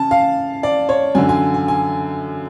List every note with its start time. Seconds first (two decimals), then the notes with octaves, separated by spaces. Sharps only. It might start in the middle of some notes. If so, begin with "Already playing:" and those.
Already playing: C#3 A5
0.11 F5
0.63 D5
0.89 C#5
1.15 F#2 D3 G#5
1.29 G#5
1.54 G#5
1.68 G#5